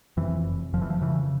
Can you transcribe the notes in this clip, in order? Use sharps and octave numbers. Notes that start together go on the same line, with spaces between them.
F2 E3
F1
F1 F3
E3
F3
C#3 E3